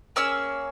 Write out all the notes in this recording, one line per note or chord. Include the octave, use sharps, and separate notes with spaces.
A#3 C#4 G#4 E6